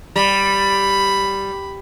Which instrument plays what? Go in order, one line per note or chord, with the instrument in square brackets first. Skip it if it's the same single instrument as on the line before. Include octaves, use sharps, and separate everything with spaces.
[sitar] G3 [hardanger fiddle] B5